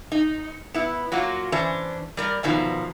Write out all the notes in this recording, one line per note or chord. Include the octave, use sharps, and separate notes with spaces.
D#4
B3 E4
F#3 A#3 F4 F#4
E3 C#4 D4 C5
G3 A#4 D5
E2 B2 D#3 F3